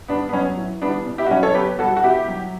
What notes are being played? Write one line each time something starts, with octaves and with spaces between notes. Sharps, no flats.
G2 B3 D4
B3
F#3 C#4
A2
E3 G3 B3 D4
B2
E4 G4
F#4
F#3 C#4 E4
A4 C#5
B2 G4 B4
G3 F#4 A4
F#4
B2 E4 G4
F#3